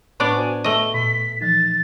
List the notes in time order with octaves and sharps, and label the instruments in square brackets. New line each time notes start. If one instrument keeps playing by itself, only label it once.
[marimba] A2 [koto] B3 D4 D5 [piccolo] C#6
[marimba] F#4 C5 [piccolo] G#5
[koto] A3 D#5 [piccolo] G7
[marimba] A#2 [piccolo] B6
[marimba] E3 F3 D#4 [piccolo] A6